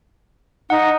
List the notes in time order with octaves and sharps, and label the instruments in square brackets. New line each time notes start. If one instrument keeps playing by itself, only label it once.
[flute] D#4 [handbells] F#5